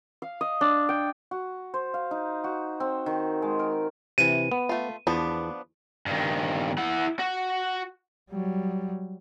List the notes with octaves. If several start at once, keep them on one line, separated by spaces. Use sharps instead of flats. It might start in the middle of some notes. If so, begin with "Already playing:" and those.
F5
D#5
D4
G5
F#4
C5
F5
D#4
F#4
C4
D#3
G#3
A#4
C3 E3 D#7
B3
A3 F4
E2 F3 B3 D4
G2 D#3
E4 F#5
F#4
F#3 G3